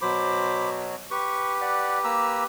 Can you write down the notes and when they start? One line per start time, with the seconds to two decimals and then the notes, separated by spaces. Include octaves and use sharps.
0.01 B2 F#3 C5 B5 D6
1.11 G4 B4 C#6
1.61 D5 F#5
2.04 A#3 A#5 E6